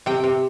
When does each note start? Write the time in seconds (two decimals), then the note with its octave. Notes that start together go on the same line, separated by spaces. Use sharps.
0.06 C3 G5
0.24 C3